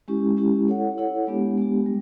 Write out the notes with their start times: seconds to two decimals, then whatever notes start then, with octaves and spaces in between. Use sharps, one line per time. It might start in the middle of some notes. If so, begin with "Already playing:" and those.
0.08 G#3 C#4 E4 G4
0.37 G#3 C#4 E4 G4
0.68 E4 A4 C#5 F#5
0.98 E4 A4 C#5 F#5
1.27 G#3 B3 D4 G4
1.57 G#3 B3 D4 G4
1.86 G3